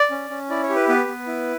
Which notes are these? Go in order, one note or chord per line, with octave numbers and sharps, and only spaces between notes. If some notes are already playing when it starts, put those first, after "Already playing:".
Already playing: D5
C#4
C#4
E4 D5
C#5
G4
B4
B3 B4
B3
E4